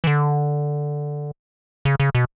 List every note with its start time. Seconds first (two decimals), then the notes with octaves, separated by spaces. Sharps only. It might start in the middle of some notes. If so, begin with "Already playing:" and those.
0.04 E3
0.07 D3
1.85 C#3
2.00 C#3
2.15 B2